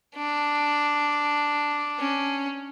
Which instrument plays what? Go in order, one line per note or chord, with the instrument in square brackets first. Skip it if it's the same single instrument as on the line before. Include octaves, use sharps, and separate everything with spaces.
[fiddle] D4
C#4